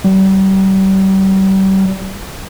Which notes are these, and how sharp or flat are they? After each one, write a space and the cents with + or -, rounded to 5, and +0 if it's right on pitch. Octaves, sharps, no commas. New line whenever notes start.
G3 -35